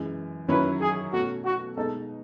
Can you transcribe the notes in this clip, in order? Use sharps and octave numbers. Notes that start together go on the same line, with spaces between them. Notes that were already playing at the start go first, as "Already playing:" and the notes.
Already playing: F#2 E3 G#3
F#2 D#3 F#3 C#4 E4 B4
G#4
B2 A3 C#4 F#4
F#4
B2 G#3 D#4 A4